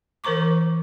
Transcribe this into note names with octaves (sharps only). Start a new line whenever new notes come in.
E3 A#4 C5 A#5 C#6 D6